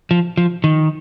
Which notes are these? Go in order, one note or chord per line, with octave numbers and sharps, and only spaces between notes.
F3
F3
D#3